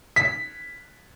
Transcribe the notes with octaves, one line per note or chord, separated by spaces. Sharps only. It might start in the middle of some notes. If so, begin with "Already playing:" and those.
B6